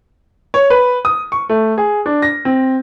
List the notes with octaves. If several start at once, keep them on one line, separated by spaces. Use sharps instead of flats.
C#5
B4
D#6
C#6
A3
G#4
D4
A#6
C4